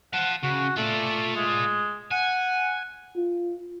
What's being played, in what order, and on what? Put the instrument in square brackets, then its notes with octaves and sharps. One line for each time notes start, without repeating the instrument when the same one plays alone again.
[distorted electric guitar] F5 A5 [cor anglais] F#5
[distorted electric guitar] C#3 [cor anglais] F#4
[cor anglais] A3 [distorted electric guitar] F4 D5
[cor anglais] G#3
[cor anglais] F#5 [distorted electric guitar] G#5
[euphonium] F4